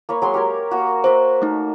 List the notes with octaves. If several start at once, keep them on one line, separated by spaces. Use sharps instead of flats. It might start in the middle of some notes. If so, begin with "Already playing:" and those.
A#3 B4 C#5
F#3 G#3 C6
G4 A#4 C#5
A#3 F#4
A#3 F#4 A#4 C5 E5
A3 D#4